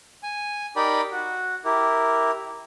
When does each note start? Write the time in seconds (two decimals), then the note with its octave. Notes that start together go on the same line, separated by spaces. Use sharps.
0.23 G#5
0.76 D#4 G4 A#4 D5 G5 B5
1.12 F#4
1.65 E4 G4 A#4